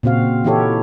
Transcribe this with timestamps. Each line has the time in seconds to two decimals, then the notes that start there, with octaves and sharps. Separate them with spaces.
0.03 A#2 C#3 C4 F#4 F5
0.44 E3 D#4 E4 G4 A4 C#5